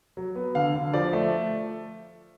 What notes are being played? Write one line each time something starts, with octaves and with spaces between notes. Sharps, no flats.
F#3
B3
D3 F5
D3
F3 D5
A3